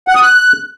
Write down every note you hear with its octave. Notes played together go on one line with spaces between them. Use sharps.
F#5
D#6
F#6